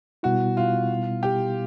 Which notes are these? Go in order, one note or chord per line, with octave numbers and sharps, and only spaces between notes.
B2 G3 B3 E4 F#4
F4
G4